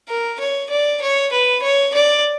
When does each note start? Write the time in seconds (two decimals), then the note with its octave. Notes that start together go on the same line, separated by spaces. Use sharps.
0.08 A#4
0.40 C#5
0.70 D5
1.02 C#5
1.32 B4
1.62 C#5
1.94 D5